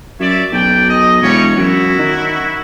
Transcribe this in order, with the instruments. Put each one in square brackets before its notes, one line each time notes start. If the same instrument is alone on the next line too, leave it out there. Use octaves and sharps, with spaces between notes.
[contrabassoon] F#2 [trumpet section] C#5 D5 E5
[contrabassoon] B1 [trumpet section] D5 G5
[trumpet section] D#5
[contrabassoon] E1 [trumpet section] G3 C#4 C#5
[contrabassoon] F#2 [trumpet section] E4 F#4
[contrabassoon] D#3